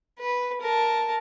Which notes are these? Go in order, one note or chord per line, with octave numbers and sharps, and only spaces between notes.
B4
A#4 A5